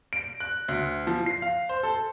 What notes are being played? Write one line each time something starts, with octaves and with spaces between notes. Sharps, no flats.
D7
F#6
D2
F3
C7
F5
C5
A4